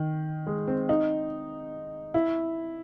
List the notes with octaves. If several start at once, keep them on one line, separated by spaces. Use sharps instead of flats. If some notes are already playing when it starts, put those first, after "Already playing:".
Already playing: D#3
G#3
C4
D#4
E4